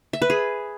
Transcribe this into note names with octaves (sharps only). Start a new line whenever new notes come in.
E5
B4
G#4